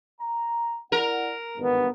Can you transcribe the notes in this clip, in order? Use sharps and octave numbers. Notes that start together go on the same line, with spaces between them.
A#5
E4 A#4 D5 F#5
G#1 E2 G2 B3